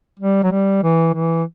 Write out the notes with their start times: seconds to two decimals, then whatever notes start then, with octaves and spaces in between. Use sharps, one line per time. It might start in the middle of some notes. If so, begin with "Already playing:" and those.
0.19 G3
0.43 F#3
0.51 G3
0.83 E3
1.14 E3